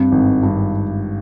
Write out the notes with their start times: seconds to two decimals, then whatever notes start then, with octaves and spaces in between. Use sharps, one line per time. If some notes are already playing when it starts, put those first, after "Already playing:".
Already playing: G2 C4
0.12 G#1
0.43 G2